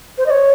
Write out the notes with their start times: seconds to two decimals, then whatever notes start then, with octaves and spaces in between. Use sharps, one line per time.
0.18 C5
0.26 D#5
0.31 C#5